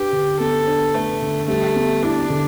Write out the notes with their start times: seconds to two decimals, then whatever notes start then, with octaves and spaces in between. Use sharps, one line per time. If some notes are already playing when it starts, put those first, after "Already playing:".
Already playing: D4 G4 B4
0.12 D3
0.39 B3 A4
0.67 D4
0.94 A3 B4
1.22 D3
1.48 G3 A3
1.76 B3
2.03 D4 E4
2.30 D3